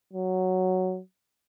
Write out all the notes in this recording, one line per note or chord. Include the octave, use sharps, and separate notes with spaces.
F#3